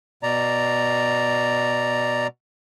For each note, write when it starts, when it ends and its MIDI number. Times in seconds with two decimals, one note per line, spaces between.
0.23 2.27 47
0.23 2.27 74
0.23 2.27 82